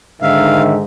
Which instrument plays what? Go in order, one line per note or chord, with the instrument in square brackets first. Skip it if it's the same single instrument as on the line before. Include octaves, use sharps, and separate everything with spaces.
[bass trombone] G#2 [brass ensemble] D3 D#3 [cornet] E5 [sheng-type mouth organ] F5